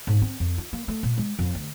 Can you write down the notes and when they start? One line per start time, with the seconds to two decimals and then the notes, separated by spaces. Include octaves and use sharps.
0.07 G#2
0.22 C4
0.40 F2
0.58 F4
0.73 A#3
0.88 A3
1.03 A#2
1.18 G#3
1.39 F2
1.55 D2